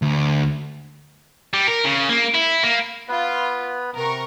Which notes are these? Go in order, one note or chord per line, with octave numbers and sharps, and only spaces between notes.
D2
G3
A#4
C#3
A#3
E4
A#3
B3 F4 B4
C3 A#4 C#6